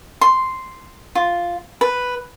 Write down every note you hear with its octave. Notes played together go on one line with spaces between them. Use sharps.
C6
F4
B4